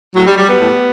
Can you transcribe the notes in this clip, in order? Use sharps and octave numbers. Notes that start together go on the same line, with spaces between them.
A2 F#3
G3
F#3 G3
B3
A2